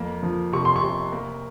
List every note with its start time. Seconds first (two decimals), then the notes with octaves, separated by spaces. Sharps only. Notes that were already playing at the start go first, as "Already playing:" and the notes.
Already playing: F2 A#3
0.23 F3
0.52 C3 C#6
0.65 C6
0.76 C#6
0.82 C3
1.12 A#3